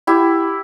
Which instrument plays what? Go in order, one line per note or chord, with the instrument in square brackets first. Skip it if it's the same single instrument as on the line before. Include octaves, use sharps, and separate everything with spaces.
[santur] E4 G4